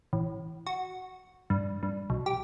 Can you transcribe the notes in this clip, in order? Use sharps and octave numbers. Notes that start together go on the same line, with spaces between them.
A1
F#4
G2
G2
B1
G4